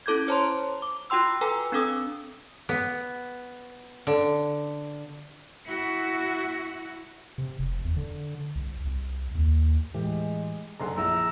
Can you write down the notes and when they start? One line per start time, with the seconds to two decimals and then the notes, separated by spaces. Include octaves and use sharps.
0.06 C#4 E4 A4 D6 G6 G#6
0.28 C5 C#5 A5 A#5 C6
0.82 D6
1.10 F4 F#4 G5 C6 E6
1.41 A4 B4 G#5 A#5 E6
1.72 C4 D4 A4 D#6 E6
2.69 B3
4.07 D3
5.66 E4 F#4
7.38 C3
7.59 F1
7.85 E2
7.97 D3
8.55 C2
8.84 C2
9.35 D#2
9.94 A2 E3 G#3 G4
10.80 F#1 D3 G#4 A#5 C6
10.97 A#1 E4 G#4 A#5 E6